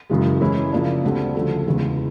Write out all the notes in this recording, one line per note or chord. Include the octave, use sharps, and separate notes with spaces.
F#2 C#3 E3 G#3
E3 G#3 C#4 E4 G#4
C#3 F3 A#3 D4
D2 D3 G3 C4
D2 C#3 F3 A3
E2 C#3 E3 G#3